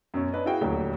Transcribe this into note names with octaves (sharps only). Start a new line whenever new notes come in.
F#2 B2 C#4
C#4 D4 B4 D#5
E4 F#4 G#4 F5 G5
D#1 D2 F#3 G4